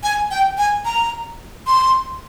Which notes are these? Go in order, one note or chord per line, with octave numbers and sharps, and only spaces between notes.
G#5
G5
G#5
A#5
C6